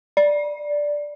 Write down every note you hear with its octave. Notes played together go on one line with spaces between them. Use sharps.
D5